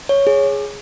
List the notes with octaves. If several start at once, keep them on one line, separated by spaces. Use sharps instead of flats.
C#5
G#4